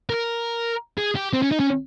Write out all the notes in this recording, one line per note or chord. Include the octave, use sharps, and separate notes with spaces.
A#4
G#4
G4
C4
C#4
D#4
C#4